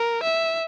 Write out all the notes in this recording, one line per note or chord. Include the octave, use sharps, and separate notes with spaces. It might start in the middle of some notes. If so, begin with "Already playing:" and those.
Already playing: A#4
E5